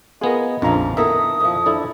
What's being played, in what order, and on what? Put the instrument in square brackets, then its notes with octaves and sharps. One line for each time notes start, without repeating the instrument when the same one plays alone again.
[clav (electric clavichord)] B3 F4 [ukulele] G#4 A#4 [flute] D#5
[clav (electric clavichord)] A#1 F2 [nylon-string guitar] C#3 F3 [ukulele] D4 A#5
[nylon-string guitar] D#3 B3 A4 [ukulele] E4 A#4 [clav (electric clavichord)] E5 A#5 [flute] D#6
[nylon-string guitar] F2 F3
[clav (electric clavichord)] D4 E4 [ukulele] A4